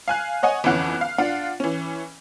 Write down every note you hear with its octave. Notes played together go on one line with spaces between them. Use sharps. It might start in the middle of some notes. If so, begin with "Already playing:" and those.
F5 G#5 F#6
C#5 D#5 F#5 G#5
G1 F2 E3 C#4 F#5 F#6
F5
D4 F4 F5 F#5
E3 C#4